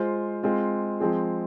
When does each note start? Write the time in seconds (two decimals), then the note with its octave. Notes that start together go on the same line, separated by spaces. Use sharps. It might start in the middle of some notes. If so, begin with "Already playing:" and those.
Already playing: G#3 F4 C5
0.43 G#3 C4 F4
1.00 F3 G#3 C4 G#4